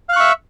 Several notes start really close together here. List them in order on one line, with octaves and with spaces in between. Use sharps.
F5 F#6 C#6 E5